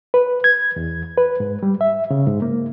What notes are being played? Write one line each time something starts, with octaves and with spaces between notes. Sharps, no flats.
B4
G#6
E2
B4
G#2
G3
E5
C#3
G#2
A#3